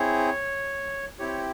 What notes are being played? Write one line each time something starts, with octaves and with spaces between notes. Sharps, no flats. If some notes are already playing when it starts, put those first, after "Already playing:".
Already playing: C4 E4 G#4 C#5
C4 E4 G4 C#5